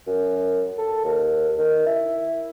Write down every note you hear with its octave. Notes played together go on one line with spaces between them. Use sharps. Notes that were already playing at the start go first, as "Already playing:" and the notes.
F#2
A4
D#2
D#3
E4